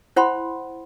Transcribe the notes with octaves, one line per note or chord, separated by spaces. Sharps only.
E4 C5 F#5 B5 C6